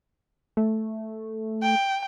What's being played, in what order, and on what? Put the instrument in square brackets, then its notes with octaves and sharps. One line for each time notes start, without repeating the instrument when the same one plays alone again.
[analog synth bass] A3
[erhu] G5